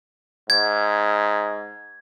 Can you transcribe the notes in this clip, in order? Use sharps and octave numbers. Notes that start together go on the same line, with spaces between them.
G#2 G#6